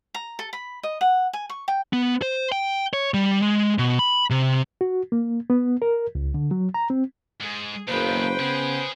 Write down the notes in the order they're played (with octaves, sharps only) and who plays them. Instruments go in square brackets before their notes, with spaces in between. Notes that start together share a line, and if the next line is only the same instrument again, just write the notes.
[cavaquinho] A#5
A4
B5
D#5
F#5
G#5
C#6
G5
[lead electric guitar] B3
C5
G5
C#5
G3
G#3
B2
B5
C3
[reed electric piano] F#4
A#3
B3
A#4
C#2
D3
F#3
A#5
C4
[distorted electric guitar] G#2 [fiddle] G#4
[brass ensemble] F#1 A#3 [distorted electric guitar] B2 D#3 [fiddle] B4 G5 [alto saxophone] C5
[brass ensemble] C#3 B3 [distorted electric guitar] C#4 G#4